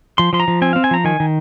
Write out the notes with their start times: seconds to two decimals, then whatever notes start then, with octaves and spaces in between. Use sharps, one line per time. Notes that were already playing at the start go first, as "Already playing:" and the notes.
0.18 F3 C6
0.33 F3 C6
0.40 A#5
0.48 F3
0.62 C4 G#5
0.73 C4 F5
0.84 G#5
0.91 F3 A#5
1.04 D#3 G#5
1.20 D#3